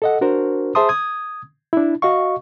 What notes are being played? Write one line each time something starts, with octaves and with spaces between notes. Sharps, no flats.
A4 D#5 F#5
D4 F#4 A#4 C5
G#4 C5 E5 A5 C6 D#6
D#6 G#6
D4 E4
F#4 D#5 F5 C#6